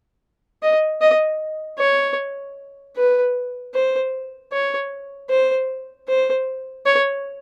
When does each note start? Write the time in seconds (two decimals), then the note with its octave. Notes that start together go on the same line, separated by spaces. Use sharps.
0.63 D#5
1.01 D#5
1.79 C#5
2.97 B4
3.74 C5
4.52 C#5
5.30 C5
6.08 C5
6.86 C#5